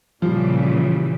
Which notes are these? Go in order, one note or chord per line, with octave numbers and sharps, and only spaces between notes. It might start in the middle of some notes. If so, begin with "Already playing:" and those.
A#2 C#3 E3 F3 G3